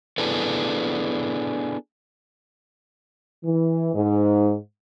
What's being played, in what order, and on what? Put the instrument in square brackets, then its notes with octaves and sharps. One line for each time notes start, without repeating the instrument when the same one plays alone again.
[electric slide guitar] B3 D4 E4 G#4 A4 B4
[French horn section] E3
G#2